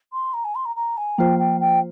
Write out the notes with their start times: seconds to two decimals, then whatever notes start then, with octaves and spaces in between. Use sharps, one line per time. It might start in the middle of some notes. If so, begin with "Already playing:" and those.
0.12 C6
0.33 A#5
0.44 G#5
0.55 C6
0.65 A#5
0.76 A#5
0.97 G#5
1.18 F3 A#3 F4 C5 G5
1.39 G5
1.60 G5